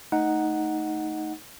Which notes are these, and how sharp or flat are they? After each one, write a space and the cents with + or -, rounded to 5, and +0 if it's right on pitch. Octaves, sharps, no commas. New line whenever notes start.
A3 +0 D#4 +0 F#5 +0